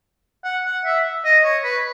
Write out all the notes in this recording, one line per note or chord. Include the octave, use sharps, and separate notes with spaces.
F#5
F#5
E5
D#5
C#5
B4